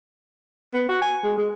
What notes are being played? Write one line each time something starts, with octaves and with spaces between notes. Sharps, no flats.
B3
F#4
G#5
G#3
G#3